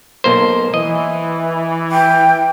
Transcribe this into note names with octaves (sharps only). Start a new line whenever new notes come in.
B1 A#3 C5
E3 D#5
G5